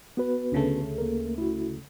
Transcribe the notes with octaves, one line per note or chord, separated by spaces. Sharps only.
B3 F#4 B4
D2 C#3 A3
A#3 A#4
E4 F#4